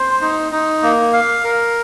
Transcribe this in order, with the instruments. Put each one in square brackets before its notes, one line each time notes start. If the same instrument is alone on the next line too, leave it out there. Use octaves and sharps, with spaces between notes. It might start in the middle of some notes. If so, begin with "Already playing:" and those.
Already playing: [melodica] C5 [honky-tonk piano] C6
[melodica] D#4
D#4
A#3
F5
A#4